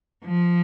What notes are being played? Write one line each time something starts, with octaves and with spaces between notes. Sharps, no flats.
F3